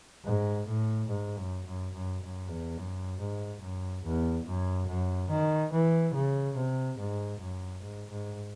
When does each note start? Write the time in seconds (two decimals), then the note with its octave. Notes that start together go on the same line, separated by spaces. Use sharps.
0.24 G#2
0.67 A2
1.09 G#2
1.37 F#2
1.65 F#2
1.93 F#2
2.21 F#2
2.49 E2
2.77 F#2
3.19 G#2
3.61 F#2
4.04 E2
4.45 F#2
4.88 F#2
5.30 D#3
5.72 E3
6.14 C#3
6.56 C3
6.98 G#2
7.40 F#2
7.82 G#2
8.10 G#2